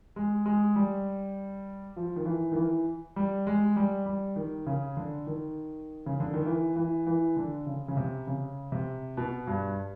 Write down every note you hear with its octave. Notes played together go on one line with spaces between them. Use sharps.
G#3
G#3
G3
F3
D#3
E3
D#3
E3
G3
G#3
G3
G3
D#3
C#3
D3
D#3
C#3
D3
D#3
E3
E3
E3
D3
C#3
C#3
C3
C#3
C3
B2
G2